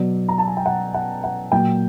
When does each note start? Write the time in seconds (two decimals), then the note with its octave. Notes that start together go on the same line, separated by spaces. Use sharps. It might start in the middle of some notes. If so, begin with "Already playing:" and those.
Already playing: B2 F#3 D5
0.28 A#5
0.38 A5
0.48 G#5
0.57 G5
0.66 F#5
0.94 F#5
1.24 F#5
1.52 A#2 F#3 G5